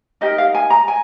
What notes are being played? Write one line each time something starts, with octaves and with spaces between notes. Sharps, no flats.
D#4 G4 A#4 D#5
F5
G#5
A#5
G#5